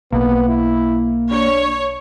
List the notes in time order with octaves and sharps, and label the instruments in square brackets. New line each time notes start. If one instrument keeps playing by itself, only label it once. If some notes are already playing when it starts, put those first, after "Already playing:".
[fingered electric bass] B1 [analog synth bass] A#3 [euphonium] B3
[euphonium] E4
[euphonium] D4 [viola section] C#5